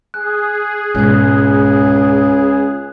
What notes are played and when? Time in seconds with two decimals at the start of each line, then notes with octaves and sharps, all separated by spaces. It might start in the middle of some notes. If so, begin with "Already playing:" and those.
0.14 G#4 F#6
0.95 C#2 G#2 B2 F#6